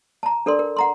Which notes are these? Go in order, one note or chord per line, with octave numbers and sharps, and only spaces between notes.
A5 A#5
D4 A4 A#4 D5 C6
A#4
F#5 A#5 C6